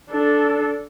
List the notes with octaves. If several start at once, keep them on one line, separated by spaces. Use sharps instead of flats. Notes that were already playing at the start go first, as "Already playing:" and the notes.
D4 A4